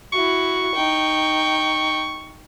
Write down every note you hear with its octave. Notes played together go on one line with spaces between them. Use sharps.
E4 F#4 C#6
D#4 G5